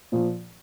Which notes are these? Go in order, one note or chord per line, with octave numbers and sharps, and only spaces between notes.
A#2 F3